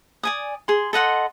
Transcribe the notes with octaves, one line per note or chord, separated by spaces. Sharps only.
D5 G#5 D#6
G#4 C6
A4 D#5 F#5 C6